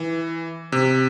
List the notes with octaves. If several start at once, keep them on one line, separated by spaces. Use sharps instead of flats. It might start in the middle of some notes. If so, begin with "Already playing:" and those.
Already playing: E3
C3